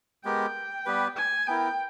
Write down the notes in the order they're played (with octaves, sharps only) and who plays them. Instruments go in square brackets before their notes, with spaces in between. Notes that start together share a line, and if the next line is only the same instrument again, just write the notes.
[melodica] G#3 B3 G4 A#4 [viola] G5
[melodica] G3 B3 G4 B4
[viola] G#5
[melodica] B3 E4 A#4 [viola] G5